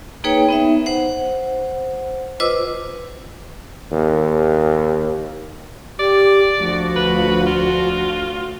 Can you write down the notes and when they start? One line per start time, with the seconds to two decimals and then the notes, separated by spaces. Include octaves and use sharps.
0.24 A#3 D#4 G#4 B4 C#5 G5
0.49 B3 D#4 E5
0.86 C5 F#5
2.40 F4 B4 C5 D#5 D6 E6
3.92 D#2
5.99 G4 D5
6.59 D2 F3 F#4
6.96 B4
7.47 F4